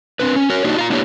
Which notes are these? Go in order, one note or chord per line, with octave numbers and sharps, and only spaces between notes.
C4 D4 B4
C#4
F#4 A#4 C#5
A#3 D4 D#4 F#4 G4
F4 F5 A#5
A#3 B3 D4 E4 G4 C#5